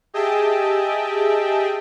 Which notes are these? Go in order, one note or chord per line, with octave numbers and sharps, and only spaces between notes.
G4 G#4 D#5 E5 G5 A5